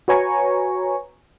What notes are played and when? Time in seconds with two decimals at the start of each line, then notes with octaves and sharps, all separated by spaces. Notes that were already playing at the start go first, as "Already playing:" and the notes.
0.08 F#4 B4 C#5 G#5 A#5 C#6